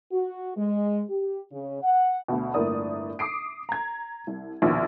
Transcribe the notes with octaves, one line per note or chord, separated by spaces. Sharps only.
F#4
G#3
G4
C#3
F#5
D2 B2
G1 A2 A#3 A#4 D5 D#6
D6 D#6 C7 D7
A#5 G#6
C2
A#1 D#2 B2